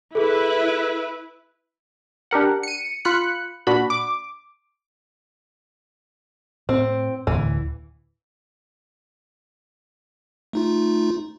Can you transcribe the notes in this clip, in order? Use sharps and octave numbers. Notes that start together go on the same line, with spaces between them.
E4 G#4 A4 B4
D4 G4 A#4 F#5
C#7 D#7
F4 B5 F#6 C#7
A#2 D4 F#4 B5
D6
A2 C4
D1 D2 E3
A3 D#4 F4